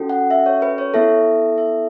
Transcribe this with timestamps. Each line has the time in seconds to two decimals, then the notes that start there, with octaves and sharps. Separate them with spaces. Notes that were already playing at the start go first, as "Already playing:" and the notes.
Already playing: C#4 F#4 A4
0.09 F#5
0.31 E5
0.46 C#5
0.62 B4
0.78 C#5
0.94 B3 E4 A4 E5
1.58 E5